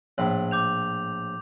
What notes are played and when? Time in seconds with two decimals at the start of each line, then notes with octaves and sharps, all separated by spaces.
0.18 A#1 A2 F#7
0.51 D6 G6 F7